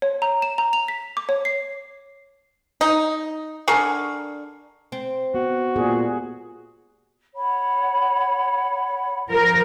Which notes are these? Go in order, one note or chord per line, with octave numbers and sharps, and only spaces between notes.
C#5
A#5
E7
A#5
F7
B6
D6
C#5
C7
D#4
D3 G#4 A#4 C#6
C4
B3 F#4
A#2 B3 G4 G#4
C#5 F#5 B5
F3 A#4